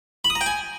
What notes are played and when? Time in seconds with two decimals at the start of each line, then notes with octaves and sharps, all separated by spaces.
0.25 B5
0.30 D#6
0.35 A#5
0.41 G5
0.46 G#5